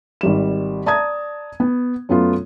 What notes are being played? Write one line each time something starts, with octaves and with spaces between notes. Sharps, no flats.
G#1 G3 E7
D5 A5 A#5 D#6 G#6
B3
F#2 A3 B3 F4